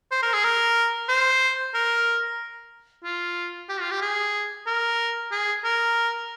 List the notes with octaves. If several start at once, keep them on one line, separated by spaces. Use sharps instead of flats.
C5
A#4
G#4
A#4
C5
A#4
F4
G4
F4
G4
G#4
A#4
G#4
A#4